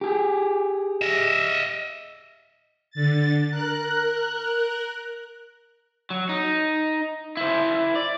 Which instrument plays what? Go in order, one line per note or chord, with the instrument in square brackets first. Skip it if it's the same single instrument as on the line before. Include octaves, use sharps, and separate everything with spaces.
[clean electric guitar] G4 G#4
[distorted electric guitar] D#5 E5
[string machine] D3 A6
A#4 F#6
[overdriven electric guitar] F#3
D#4
E4 C5
D5